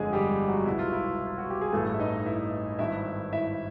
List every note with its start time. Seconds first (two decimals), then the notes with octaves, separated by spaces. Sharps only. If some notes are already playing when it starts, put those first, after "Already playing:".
Already playing: G1 F2 D3 G#3 G#4
0.13 G3 G4
0.48 F#3 F#4
0.66 C2 B2 E4
0.79 F4
0.93 E4
1.27 F4
1.38 F#4
1.50 G4
1.61 G#4
1.72 A1 G2 E3 A3 A4
1.94 E5
2.00 D#4 D#5
2.26 E4 E5
2.79 G#1 G2 D#3 E4 E5
3.32 E4 E5